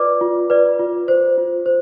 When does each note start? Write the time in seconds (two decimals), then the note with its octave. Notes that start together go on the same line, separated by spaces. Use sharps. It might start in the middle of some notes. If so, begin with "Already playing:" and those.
Already playing: F4 B4 D5 D6
0.21 F4
0.50 B4 D5
0.79 F4
1.08 C5
1.38 F4
1.66 C5